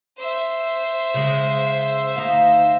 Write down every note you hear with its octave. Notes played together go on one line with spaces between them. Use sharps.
C5 E5
C#3 G#3
D2 D#4 F5